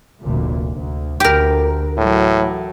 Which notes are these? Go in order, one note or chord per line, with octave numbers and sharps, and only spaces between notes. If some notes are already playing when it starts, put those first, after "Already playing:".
F1 D2 A#2
D2
D2 G4 A#4
A2 E3 F#3